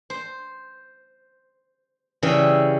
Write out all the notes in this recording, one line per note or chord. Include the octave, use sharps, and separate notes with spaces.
C5
C#3 E3 G3 E4